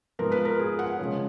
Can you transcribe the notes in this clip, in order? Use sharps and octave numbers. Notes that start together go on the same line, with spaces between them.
G#2 F3 B3 A#4
B4
A#4
G#4
F#5
C#3 F3 G#3 C#4